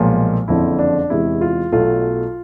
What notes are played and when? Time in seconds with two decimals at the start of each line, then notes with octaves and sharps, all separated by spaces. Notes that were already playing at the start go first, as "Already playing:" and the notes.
Already playing: B1 A#2 F3 G#3
0.48 F#1 F2 D3 F3 E4
0.79 D4
1.10 E2 C3 E3 G#3 E4
1.41 F4
1.72 B1 B2 F#3 A3 F4